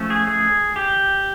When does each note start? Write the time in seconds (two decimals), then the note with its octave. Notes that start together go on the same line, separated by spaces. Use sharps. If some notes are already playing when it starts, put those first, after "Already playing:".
Already playing: F3 A3 C#4
0.10 G#4
0.27 G#4
0.76 G4